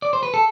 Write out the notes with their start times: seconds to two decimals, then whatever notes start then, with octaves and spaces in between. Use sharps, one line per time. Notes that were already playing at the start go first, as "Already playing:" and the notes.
0.02 D5
0.13 C5
0.23 B4
0.34 A4